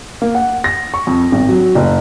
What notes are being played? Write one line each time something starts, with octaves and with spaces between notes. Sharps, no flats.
A#3
F#5
A#6
C#6
F2
G#1
F#3
F#1